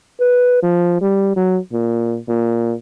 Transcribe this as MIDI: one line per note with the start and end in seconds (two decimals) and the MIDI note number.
0.20 0.61 71
0.62 0.98 53
1.01 1.35 55
1.36 1.58 54
1.73 2.18 46
2.28 2.74 46